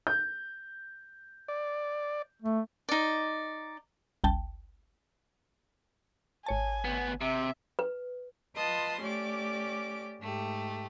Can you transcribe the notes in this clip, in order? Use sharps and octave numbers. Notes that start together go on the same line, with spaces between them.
G6
D5
A3
D#4 D5
G1 C#2 G5 A5
G#1 C#5 G#5 A5
D2 B3
C3 E5
B4
F4 B4 D#5 A5 C6 D#6
A3 C#4 G4 D5 D6
G#2 A3 G4